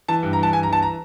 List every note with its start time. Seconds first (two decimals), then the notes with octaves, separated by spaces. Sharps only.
0.08 E3 A5
0.23 G2
0.33 A#5
0.38 E3 A5
0.53 G2 G#5
0.63 A#5
0.68 E3 A5
0.82 A#5